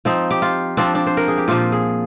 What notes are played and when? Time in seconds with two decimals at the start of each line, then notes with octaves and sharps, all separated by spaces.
0.05 F3 C4 D#4
0.31 G4
0.42 F4
0.77 F3 C4 D4
0.95 D4
1.07 C5
1.17 A#4
1.28 G#4
1.38 G4
1.48 A#2 F3 A#3 F4
1.72 G#4